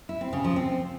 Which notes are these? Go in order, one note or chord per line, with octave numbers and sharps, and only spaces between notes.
E4
C4
C#3
F3
C4